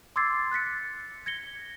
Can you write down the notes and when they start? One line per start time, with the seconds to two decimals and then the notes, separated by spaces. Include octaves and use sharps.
0.16 C6 D6 E6 G#6 A6 C7
0.52 F#6 A6 B6 C#7
1.26 G#6 A#6 C#7 G7